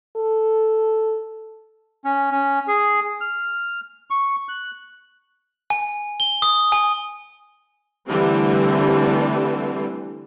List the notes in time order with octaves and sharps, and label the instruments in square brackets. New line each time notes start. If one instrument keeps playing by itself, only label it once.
[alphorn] A4
[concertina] C#4
C#4
G#4
F6
C#6
F#6
[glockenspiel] G#5
G7
D#6
G#5
[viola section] D3 E3 G3 A3 C4